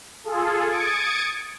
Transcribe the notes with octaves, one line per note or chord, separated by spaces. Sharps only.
F4 G#4 A4
D#6 G#6 A6 C#7 D7